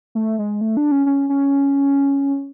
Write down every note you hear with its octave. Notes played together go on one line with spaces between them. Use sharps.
A3
G#3
A3
D4
C#4
C#4
C#4